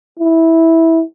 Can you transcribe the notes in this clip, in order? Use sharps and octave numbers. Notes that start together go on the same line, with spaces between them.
E4